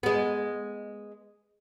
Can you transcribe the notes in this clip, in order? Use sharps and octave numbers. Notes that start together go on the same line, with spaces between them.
G#3 B3